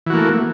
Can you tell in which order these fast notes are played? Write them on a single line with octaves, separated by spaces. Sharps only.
E3 F#4 A#3 A3